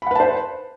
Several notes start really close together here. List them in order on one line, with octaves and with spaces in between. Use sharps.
B5 F#5 B4 A5 C5